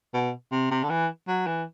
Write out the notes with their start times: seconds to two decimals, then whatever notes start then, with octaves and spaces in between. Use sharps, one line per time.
0.14 B2
0.52 C3
0.71 C3
0.83 D3
0.89 E3
1.28 F#3
1.46 E3